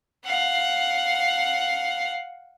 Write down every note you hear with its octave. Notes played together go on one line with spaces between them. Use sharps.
F5 F#5